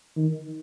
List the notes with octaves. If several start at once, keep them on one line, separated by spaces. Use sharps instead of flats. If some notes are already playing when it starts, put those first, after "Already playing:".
D#3